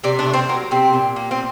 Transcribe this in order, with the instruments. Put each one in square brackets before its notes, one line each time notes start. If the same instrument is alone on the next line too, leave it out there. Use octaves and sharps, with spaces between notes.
[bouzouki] C3 D4
D4
A3
C4
F#3 A#3
C3 C4
A#2
A#3
C4